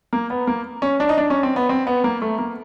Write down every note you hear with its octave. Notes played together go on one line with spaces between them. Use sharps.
A#3
B3
A#3
C#4
D4
D#4
D4
C#4
C4
B3
C4
B3
A#3
A3
A#3